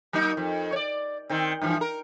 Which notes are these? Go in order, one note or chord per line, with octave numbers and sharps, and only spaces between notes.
F#3 A#3 D#4
F2
C#5 D5
D#3 C4
G2 E3 F3
A#4